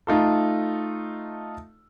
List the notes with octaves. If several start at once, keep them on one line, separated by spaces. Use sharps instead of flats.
A3 D#4 F4 A4